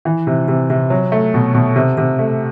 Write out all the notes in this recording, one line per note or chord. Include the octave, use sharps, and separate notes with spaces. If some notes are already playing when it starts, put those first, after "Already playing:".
E3
C3
C3
C3
F#3
A3
B2
B2
C3
C3
A3